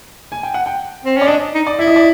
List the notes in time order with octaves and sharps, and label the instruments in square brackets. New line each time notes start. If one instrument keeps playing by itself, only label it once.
[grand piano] G#5
G5
F#5
G5
[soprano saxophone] C4
[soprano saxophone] C#4 [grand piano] D5
[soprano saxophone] D4 [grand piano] D#5
[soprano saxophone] D#4
[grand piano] D5
[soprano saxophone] E4 [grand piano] E5
[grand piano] D#5
D5